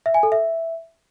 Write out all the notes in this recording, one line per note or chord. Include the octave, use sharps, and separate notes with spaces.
E5
G#5
A4
E5